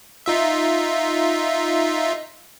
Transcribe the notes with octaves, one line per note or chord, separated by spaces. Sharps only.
D#4 F4 E5